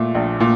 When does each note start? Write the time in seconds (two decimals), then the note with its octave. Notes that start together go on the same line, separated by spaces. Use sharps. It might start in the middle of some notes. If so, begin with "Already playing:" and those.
Already playing: A#2 A3
0.15 A#1
0.40 A#2